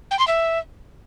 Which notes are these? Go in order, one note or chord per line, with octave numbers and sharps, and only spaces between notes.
G5
C6
E5